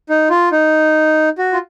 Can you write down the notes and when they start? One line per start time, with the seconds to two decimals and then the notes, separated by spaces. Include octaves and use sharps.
0.09 D#4
0.30 F4
0.52 D#4
1.38 F#4
1.53 F4